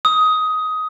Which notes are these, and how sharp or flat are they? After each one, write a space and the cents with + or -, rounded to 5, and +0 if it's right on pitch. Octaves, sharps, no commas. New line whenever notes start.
D#6 +15